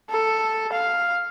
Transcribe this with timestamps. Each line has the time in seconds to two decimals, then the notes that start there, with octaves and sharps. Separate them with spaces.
0.10 A4
0.72 F5